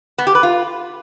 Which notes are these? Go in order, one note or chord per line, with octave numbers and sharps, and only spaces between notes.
B3
G4
B4
F4